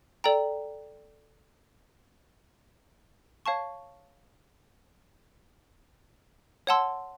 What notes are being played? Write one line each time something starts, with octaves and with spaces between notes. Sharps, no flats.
A4 D5 G5 A#5
C#5 F5 A5 C#6
C#5 F#5 A5 C6 E6